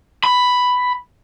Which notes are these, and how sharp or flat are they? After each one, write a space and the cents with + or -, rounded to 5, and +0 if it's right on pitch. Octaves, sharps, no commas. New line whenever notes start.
B5 +5